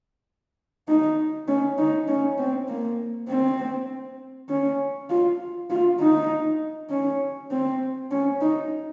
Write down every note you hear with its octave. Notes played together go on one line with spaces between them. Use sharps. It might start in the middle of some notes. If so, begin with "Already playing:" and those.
D#4
C#4
D#4
C#4
C4
A#3
C4
C#4
F4
F4
D#4
C#4
C4
C#4
D#4